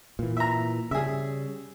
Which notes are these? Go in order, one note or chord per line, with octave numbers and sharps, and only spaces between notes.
A#2 E3
E5 A#5
C#3 G3 G#4 E5